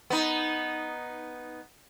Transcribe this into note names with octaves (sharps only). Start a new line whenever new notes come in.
B3 D#4